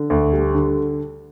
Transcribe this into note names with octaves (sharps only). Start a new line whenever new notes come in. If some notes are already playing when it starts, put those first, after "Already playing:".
Already playing: D3
D2
G3
D3